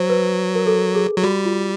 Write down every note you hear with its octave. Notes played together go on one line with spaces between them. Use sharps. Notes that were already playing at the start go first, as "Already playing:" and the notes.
Already playing: F#3 C5
B4
A#4
A4
G#4
F#3
G3 F#4
F4